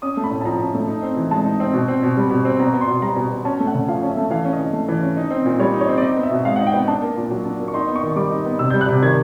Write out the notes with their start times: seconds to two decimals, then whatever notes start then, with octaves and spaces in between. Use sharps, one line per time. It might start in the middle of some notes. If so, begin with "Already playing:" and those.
0.02 C#4 D#6
0.17 A3
0.24 B5
0.31 A2
0.41 A5
0.45 F3 A#5
0.60 C#4
0.74 A3
0.88 D#4
1.03 C4
1.16 E3
1.31 G#3 A5
1.45 D#4
1.60 C4
1.73 B2
1.88 C4
2.03 B2
2.17 G3
2.31 B2
2.45 C4
2.59 B2 A#5
2.74 B3
2.81 C6
2.88 B2
3.02 G3 A#5
3.16 B2
3.31 B3
3.45 C#4 A5
3.60 A3
3.67 F#5
3.74 C#3
3.88 F3 F5
4.02 C#4
4.10 E5
4.17 A3
4.30 E3 F5
4.45 C#4
4.53 D#5
4.59 E3
4.73 A3
4.88 E3
5.02 C#4
5.17 D#4
5.31 C4
5.46 A#2
5.59 G3 C#5
5.74 D#4
5.81 C#5
5.88 C4
5.98 D5
6.02 D#4 D#5
6.17 B3
6.23 E5
6.31 B2
6.45 G#3 F5
6.56 D#4 F#5
6.67 G5
6.74 B3
6.88 D4 A5
7.02 A#3
7.17 A#2
7.31 F#3
7.45 D4
7.60 A#3
7.68 C#6
7.73 D#4 C6
7.88 B3
7.96 C#6
8.03 D#3
8.12 C#6
8.16 G3 D6
8.30 D#4
8.46 B3
8.59 C3 E6
8.70 G3 G6
8.81 F#6
8.88 C3
9.02 D#3 G#6